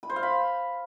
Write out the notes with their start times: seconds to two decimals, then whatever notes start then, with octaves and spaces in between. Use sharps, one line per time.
0.03 B5
0.10 C5
0.16 F5
0.23 B5